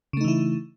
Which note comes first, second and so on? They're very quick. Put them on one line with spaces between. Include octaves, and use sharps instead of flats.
C#3 A3 D#4 E3 E4